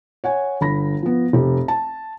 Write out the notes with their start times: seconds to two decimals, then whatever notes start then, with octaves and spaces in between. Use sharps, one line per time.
0.24 C#5 F#5 G#5
0.61 G1 B5 A#6
1.02 F3 B3
1.33 F1 G4
1.68 A5